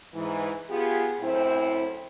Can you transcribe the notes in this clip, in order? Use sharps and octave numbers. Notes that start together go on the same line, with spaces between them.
G#2 E3
B3 F4 G4 G#4
F#2 A2 C4 E4 C5